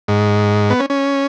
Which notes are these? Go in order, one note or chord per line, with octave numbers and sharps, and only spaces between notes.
G#2
B3
C#4
C#4